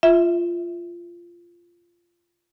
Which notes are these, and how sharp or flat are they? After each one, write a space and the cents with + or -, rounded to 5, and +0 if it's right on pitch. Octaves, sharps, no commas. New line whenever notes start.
F4 -15 E5 -5